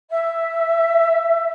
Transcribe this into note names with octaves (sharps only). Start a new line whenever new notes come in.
E5